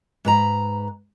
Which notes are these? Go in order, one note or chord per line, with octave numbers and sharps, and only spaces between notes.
G#2 B4 A#5